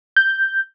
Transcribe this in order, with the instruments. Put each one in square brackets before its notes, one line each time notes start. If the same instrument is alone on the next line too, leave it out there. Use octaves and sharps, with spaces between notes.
[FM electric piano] G6